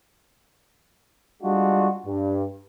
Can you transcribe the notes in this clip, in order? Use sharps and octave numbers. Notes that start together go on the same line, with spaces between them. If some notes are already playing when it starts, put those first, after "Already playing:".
G3 G#3 D4 F4 F#4
G2